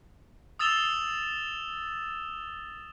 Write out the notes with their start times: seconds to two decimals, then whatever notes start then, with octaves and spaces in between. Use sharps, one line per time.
0.59 D#6 E6 A6 E7 F7 G7